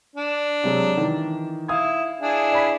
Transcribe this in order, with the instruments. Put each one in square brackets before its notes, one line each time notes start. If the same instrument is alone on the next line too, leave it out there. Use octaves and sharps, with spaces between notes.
[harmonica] D4
[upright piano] C3 F#3 G#3
D#3 E3
[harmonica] E4 [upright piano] F5 D#6 G#6
[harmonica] D4 E4 G#4
[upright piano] D5 B5 B6